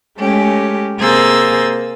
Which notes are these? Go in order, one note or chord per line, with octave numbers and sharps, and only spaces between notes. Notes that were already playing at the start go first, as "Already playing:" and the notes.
G#3 A3 C#4 G4
C3 A#3 G#4 C5 E6 A6